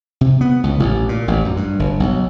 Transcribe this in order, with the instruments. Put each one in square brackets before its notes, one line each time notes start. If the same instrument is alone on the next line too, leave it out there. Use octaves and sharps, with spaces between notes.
[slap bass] C3
B3
C#2
A1
A#2
A1
F#2
G2
G1
B1